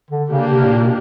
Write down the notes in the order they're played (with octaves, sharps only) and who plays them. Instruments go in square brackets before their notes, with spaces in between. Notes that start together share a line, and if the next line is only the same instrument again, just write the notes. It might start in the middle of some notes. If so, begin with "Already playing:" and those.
[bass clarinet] D3
[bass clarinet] C#3 [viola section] A#3 D4 G4
[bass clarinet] C3
A2
A#2
B2